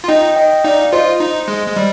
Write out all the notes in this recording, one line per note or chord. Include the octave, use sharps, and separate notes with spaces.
F4
D#4 D#5 G5
D#5 G5
D#4 D5 F5
F4 C5 D#5
D#4
G#3
G#3
G3